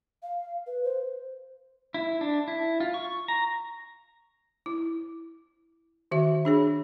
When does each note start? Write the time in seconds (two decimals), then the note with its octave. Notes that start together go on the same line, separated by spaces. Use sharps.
0.23 F5
0.67 B4
0.84 C5
1.94 E4
2.21 D4
2.48 E4
2.80 F4
2.94 C#6
3.28 A#5
4.66 E4
6.11 D#3 F#4 E5
6.45 D4 G#4 C#5